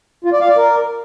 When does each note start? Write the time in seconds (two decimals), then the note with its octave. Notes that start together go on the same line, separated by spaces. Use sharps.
0.24 F4
0.33 D5
0.41 F5
0.49 D5
0.57 A#4